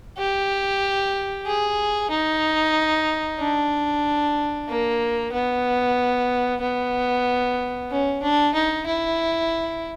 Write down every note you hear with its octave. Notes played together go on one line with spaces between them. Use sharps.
G4
G#4
D#4
D4
A#3
B3
B3
C#4
D4
D#4
E4